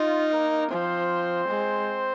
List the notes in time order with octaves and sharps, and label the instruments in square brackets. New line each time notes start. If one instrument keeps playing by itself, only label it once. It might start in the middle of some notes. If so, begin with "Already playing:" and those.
Already playing: [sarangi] D#4 [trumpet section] F4
[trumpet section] A#3 A#4
[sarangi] F3 [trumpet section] C4 C5
[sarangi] G#3